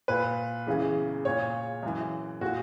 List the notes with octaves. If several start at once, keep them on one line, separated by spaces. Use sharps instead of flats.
A#2 B4
E2 C#3 E3
A#2 C#5
F#2 E3
A#2 F#4